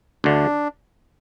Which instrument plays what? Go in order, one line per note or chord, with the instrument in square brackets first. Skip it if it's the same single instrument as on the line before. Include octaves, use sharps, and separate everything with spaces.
[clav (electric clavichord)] D2 D3 A3 [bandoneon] D4